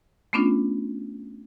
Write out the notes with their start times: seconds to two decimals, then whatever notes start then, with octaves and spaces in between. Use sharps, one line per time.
0.33 A3 B3 C#4 D4 F4